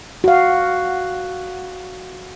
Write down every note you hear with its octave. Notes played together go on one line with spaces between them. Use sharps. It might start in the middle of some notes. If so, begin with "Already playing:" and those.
F#4 F5